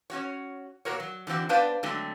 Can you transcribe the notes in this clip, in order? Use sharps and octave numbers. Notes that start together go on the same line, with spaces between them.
C#4 F#4 C#5
A#2 F#4 A#4 C#5
F#3
D3 E3 C4 F#4
B3 D4 B4 C5 F5
D3 F#3 G#3 A3 C4